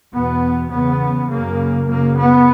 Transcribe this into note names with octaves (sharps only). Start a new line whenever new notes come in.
E2 B2 B3
E2 C#3 B3
F#2 C#3 A#3
F#2 C#3 A#3
B3